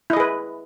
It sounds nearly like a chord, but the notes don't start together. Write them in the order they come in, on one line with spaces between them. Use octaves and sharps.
E4 D#5 G#4 B4